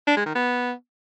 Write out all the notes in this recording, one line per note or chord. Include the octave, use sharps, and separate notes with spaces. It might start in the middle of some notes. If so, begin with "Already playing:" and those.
D4
G#3
D#3
B3